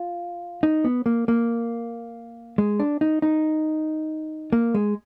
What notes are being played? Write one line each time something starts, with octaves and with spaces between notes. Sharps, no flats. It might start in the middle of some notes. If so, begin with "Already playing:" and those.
Already playing: F4
D#4
B3
A#3
A#3
G#3
D4
D#4
D#4
A#3
G#3